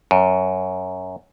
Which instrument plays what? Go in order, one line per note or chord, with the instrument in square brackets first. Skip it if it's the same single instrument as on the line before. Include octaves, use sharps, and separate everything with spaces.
[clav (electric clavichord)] F#2